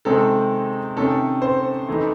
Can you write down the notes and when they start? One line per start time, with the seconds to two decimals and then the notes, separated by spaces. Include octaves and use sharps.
0.05 C3 D#3 G#3 C4 D#4 A4
0.96 C3 D#3 A3 C#4 A4
1.42 C5
1.88 E3 A3 D#4